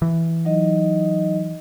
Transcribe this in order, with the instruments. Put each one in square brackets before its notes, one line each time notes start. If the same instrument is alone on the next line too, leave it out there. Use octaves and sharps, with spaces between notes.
[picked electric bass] E3
[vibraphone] F#3 D#4 D#5